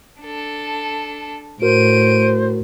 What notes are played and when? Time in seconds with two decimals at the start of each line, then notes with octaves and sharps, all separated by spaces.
0.21 D4 A4
1.62 A2 F#4 A#4 C5 D7 D#7